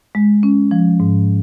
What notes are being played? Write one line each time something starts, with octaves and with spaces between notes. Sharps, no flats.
G#3
C#4
F3
G#2